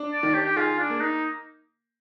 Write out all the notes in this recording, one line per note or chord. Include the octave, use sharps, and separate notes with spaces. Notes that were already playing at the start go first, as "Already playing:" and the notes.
Already playing: D4
D5
D#3
G4
G4
F4 G#4
D4
A#3
D#4